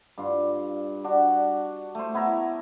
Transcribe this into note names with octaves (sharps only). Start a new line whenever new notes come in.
G2 F4
D4 F#4
A3 C5
B3 E4 E5 A#5